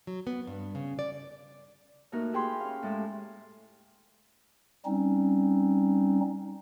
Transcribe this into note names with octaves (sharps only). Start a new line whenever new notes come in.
F#3
B3
G2
C#3
D5
A2 A#3 D#4 F#4 A#4
E4 G4 G#4 G5 B5 C6
C#4 F5
A2 G#3 A4
G3 C4 C#4 D#4